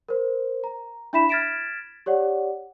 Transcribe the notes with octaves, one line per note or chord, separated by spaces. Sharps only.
A#4 C5
A#5
D4 E4 E5 B5 B6 E7
F6 G#6 A6 B6 D7 E7
G4 C#5 D5 F#5